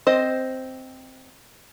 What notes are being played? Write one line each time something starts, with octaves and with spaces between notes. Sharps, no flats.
C4 C5 D#5